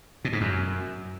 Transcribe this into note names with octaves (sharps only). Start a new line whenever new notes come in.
B2
G#2
F#2